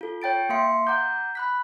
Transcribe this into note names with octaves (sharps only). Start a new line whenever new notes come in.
F4 A4
C#5 G5 A6 D7
A#3 E5 F5 C6 C#7
F#5 A#5 D6 G6
B5 F#6 B6